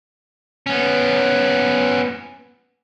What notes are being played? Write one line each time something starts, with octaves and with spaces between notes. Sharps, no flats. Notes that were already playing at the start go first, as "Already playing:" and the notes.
B3 C#4